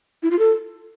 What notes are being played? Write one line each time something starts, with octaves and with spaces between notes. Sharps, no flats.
E4
F4
A4